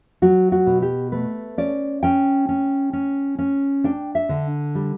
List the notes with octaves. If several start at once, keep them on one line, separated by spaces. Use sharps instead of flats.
F#3 F#4
F#4
B2
G4
A3 B4
C#4 D5
C#4 G5
C#4
C#4
C#4
D4 G5
E5
D3
G3